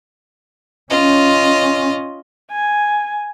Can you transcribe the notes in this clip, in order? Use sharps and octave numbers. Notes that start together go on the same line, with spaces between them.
C#4 F4 D#5
G#5